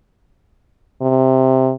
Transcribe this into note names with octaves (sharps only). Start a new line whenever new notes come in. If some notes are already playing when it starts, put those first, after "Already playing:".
C3